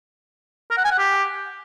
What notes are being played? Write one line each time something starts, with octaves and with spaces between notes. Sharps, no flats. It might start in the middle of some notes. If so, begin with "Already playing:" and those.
A#4
F#5
G#5
F#5
G4